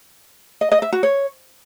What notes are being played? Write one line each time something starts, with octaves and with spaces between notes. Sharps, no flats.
D#5
D#5
E5
F#4
C#5